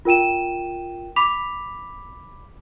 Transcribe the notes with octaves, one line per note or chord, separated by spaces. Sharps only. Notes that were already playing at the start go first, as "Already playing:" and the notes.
F4 A#4 G5 D#7 E7
B5 D6 B6 F7